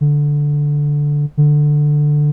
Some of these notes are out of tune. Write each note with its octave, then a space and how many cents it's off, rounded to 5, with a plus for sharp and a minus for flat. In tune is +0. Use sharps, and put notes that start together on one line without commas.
D3 -5
D3 +10